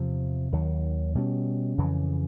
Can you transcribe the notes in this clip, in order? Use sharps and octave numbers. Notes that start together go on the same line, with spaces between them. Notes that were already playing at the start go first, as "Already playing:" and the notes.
Already playing: E2 C3 F3
D#2 D#3 F#3
B2 G3 A#3 C#4
F2 C#3 E3